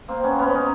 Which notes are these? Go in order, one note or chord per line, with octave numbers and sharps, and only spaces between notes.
A#3 C4
B3 C#4
B3 C#4
C#4 D#4